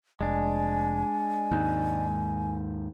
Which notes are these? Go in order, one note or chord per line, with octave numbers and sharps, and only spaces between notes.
F1 G#3 D4 G#5
D#2 G#2